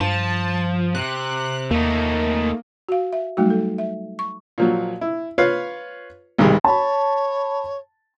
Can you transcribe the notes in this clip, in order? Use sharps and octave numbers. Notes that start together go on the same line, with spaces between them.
G2 F3 A5
C3 F#6
D#2 A3 A#3 D#4
F#4 F5
E5
F#3 G3 A3 D#4 F#4
A4
E5
C#6
A#2 F3 F#3
E4
F4 B4 C#5 F5
B1 G#2 D#3 G3 G#3
C#5 A5 B5